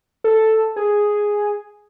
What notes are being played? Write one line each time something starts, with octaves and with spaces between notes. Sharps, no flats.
A4
G#4